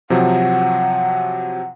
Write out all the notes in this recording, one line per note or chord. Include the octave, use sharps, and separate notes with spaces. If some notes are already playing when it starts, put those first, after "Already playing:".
C3 F3 F#3 F#5